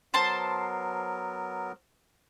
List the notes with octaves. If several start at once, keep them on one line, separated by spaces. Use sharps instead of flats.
F#3 B3 A#4 C5 A5 C6